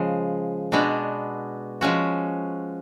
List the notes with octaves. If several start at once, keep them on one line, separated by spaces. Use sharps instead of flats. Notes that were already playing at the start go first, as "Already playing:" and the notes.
Already playing: C#3 F3 G#3
B2 G#3 B3 D4 F#4
F3 G#3 C#4 F#4